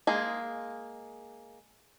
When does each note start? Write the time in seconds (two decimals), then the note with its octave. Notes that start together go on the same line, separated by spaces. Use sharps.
0.07 G#3 A#3 G#4